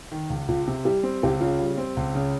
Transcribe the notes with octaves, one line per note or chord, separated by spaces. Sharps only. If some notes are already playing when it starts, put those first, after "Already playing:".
D#3
C#2
C#2 F4
C3
G3 G4
C4
C#2 G4
C#3 F4
G3
C4
C#2
C#3